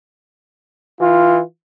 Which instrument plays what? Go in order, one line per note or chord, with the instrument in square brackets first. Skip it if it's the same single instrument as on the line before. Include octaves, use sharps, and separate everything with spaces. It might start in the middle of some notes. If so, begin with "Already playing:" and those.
[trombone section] E3 F4